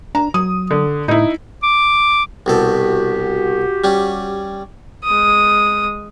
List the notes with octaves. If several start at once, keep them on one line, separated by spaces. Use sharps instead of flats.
D4 A#5
F#3 D#6
D3
A2 D#4 E4
D6
C2 B2 F#4 G4 A4
G3 C#4
G#3 D#6